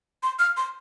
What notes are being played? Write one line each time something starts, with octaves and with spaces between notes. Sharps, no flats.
C6
F6
C6